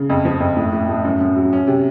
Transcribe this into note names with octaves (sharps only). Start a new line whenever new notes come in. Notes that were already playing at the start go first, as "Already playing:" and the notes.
Already playing: C#3
F2
F3
F2
A2
A2
A2
F#2
F#2
F#3
C#4
C3